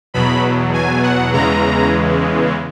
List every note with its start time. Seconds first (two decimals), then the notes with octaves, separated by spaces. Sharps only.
0.14 E2 B2 F#3 B5
0.74 G#5
1.03 F#5
1.33 E2 C#3 E3 G#3 A#5